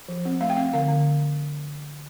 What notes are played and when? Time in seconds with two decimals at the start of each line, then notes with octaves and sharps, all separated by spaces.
0.08 F3
0.25 C4
0.41 A3 F5
0.50 G5
0.57 C4 F5
0.73 D3 F5
0.89 D3